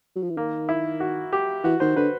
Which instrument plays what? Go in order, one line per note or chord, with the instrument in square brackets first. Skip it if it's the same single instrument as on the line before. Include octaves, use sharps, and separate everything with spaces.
[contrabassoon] F#3
F3
E3
[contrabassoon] D#3 [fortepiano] A#3
[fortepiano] E4
F#4
G4
[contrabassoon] E3 [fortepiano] F#4
[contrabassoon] D#3 [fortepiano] C5
[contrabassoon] D3 [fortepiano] B4